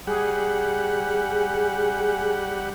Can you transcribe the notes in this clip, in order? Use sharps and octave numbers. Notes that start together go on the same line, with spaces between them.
G3 G#4 F#5